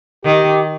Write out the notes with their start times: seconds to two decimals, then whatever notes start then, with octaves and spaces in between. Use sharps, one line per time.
0.25 D#3 G4